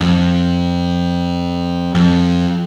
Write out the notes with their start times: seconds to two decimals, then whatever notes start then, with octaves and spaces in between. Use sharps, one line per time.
0.01 F2
1.95 F2